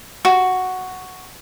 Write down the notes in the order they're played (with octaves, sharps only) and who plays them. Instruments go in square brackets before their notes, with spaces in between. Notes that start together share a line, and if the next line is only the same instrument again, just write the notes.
[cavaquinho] F#4